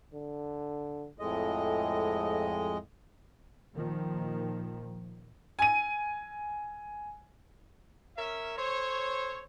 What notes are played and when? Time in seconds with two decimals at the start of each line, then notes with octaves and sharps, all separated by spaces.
0.13 D3
1.20 F2 A2 G#3 D#5
3.74 A#2 D#3 F3
5.59 G#5 D#7
8.17 C#4 A#4 C#5 E5
8.58 A4 C5 C#5